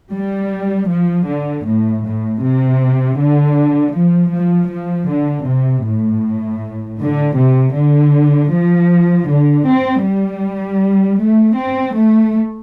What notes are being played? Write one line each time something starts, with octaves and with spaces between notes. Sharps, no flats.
G3
F3
D3
A2
A2
C3
D3
F3
F3
F3
D3
C3
A2
D3
C3
D3
F3
D3
C4
G3
A3
C4
A3